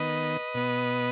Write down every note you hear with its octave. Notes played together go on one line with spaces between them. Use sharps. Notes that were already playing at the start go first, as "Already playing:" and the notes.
Already playing: D#3 B3 B4 D#5
B2 B3